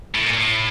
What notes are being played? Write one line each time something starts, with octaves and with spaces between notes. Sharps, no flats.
A2
A#2
A2